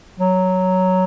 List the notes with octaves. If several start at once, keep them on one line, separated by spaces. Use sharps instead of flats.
F#3